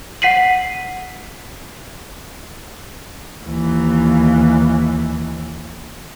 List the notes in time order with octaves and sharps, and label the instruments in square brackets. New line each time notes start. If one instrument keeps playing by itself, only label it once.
[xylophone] F#5 B6 C7 D#7 F#7
[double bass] D#2 E3